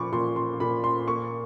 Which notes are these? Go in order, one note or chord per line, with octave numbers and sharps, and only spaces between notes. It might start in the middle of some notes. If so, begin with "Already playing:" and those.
Already playing: A#2 F3 B5 C#6 D6
A#2 C6
C6
A#2 B5
C6
A#3 C#6